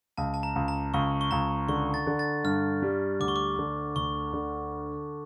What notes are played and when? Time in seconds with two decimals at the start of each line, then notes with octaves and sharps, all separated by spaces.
0.17 C#2 A5
0.34 A5
0.43 A#5
0.55 C#2
0.68 A#5
0.94 C#2 C#6
1.21 C#6
1.31 C#2 A#5
1.68 D3 C#6
1.94 A6
2.07 D3
2.19 A6
2.44 G2 F6
2.82 G3
3.20 D2 D6
3.28 C#6
3.36 D6
3.58 D3
3.96 D2 C#6
4.33 D3